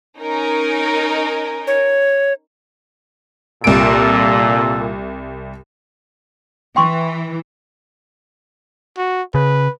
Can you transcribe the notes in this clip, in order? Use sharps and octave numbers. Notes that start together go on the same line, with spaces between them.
C#4 D#4 A#4
C#5
C2 A#2 A4 D7
E3 G5 C6 C#6
F#4
C#3 B4